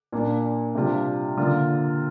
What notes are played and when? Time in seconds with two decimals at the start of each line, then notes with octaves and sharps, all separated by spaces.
0.12 A#2 A#3 D4
0.75 C3 G3 D4 F4
1.37 D3 A#3 F4